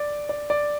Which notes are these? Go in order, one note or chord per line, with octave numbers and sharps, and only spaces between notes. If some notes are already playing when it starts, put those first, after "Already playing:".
Already playing: D5
D5
D5